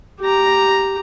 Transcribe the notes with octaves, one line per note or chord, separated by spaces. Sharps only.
G4 A#5